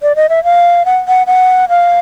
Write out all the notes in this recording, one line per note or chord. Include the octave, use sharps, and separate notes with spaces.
D5
D#5
E5
F5
F#5
F#5
F#5
F5